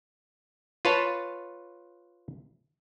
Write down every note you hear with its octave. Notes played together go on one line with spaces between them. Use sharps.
F4 B4 C#5 A5